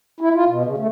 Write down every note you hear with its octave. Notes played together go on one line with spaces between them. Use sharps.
E4
F4
B2
C#3
A3